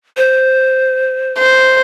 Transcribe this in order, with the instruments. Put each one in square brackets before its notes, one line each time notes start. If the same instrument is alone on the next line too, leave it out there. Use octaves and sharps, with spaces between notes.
[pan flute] C5
[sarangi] C5